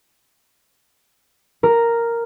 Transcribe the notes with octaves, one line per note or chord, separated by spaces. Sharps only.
A#4